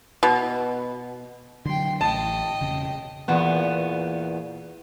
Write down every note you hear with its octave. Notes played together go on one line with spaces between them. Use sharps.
B2
D3 F#3 G5 C6
A1 D#5 G5 A5
E1 C#3
E2 A#2 B3